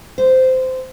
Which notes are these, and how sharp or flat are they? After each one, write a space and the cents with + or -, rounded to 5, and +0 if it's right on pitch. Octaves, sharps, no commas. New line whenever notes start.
C5 -15